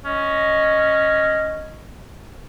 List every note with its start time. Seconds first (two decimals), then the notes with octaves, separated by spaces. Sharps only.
0.05 C#4 D#5